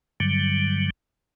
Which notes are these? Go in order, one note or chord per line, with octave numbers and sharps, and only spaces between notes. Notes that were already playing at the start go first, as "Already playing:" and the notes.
G2 D3 F#3 G3